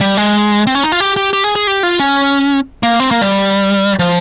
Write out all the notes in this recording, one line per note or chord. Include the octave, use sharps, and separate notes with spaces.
G3
G#3
C4
C#4
D#4
F4
G4
G4
G4
G#4
G#4
G4
F4
C#4
A#3
C4
A#3
G3
F3